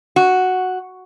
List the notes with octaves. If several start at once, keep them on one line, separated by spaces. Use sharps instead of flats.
F#4